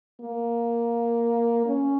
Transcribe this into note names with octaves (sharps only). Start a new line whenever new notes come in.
A#3
C#4